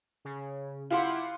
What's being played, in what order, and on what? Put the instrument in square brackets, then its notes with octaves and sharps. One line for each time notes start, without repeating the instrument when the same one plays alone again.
[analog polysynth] C#3
[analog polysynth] E4 G4 F#5 [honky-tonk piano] F4 F5 C6